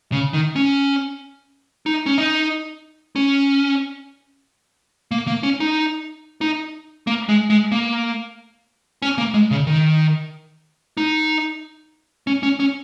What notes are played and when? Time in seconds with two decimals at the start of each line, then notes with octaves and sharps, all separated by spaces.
0.12 C#3
0.33 D#3
0.56 C#4
1.86 D#4
2.06 C#4
2.18 D#4
3.16 C#4
5.11 A#3
5.27 A#3
5.43 C#4
5.60 D#4
6.41 D#4
7.07 A#3
7.29 G#3
7.50 G#3
7.72 A#3
9.02 C#4
9.18 A#3
9.34 G#3
9.51 C#3
9.67 D#3
10.97 D#4
12.27 C#4
12.43 C#4
12.60 C#4